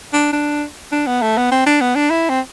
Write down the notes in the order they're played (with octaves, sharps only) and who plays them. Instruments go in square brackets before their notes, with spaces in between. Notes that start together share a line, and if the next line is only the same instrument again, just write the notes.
[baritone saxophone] D4
D4
D4
B3
A3
B3
C4
D4
B3
D4
E4
C4